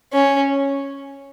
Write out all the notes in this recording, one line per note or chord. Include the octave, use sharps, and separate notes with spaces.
C#4